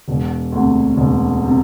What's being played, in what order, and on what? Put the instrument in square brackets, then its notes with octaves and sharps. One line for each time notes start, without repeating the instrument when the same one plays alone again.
[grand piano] E1
D2 C3
E1
C3